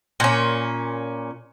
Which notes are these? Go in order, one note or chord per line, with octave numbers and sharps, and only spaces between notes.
A#2 C#4